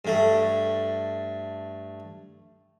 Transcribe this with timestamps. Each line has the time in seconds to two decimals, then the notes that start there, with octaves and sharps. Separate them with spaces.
0.05 G2 A3